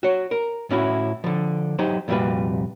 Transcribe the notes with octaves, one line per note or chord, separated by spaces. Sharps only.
F#4 C#5
A#4
A2 C#4 E4 F#4
D3 F3
F#3 D#4 G4 C5
C2 F2 A#2 G3 F#4 B4